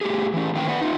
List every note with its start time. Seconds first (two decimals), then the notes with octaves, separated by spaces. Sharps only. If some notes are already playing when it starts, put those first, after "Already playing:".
0.01 A2 G4 G#4
0.33 E3 C#4
0.55 A2 D#3 A#3 B4 F5 G5
0.69 B4 D5 F#5
0.81 D#4 F4